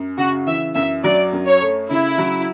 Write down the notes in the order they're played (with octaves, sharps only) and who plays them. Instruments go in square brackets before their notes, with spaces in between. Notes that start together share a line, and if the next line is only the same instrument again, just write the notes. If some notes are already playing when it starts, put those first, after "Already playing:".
Already playing: [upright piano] F#2
[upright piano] C#3 [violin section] F#4
[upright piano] E3 [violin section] E5
[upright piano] F#2 [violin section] E5
[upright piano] F#3 [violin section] D5
[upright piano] F#2
[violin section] C#5
[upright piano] A3
[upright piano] C#3 [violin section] E4
[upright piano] F#3